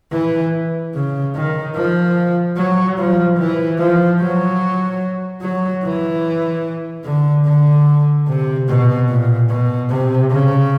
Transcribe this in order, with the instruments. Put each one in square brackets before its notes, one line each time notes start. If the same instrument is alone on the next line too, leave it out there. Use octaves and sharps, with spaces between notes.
[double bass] E3
C#3
D#3
F3
F#3
F3
E3
F3
F#3
F#3
E3
D3
D3
C3
B2
A#2
B2
C3
C#3